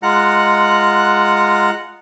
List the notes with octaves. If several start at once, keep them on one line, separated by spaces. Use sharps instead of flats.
G#3 F4 F#5 A#5 F#6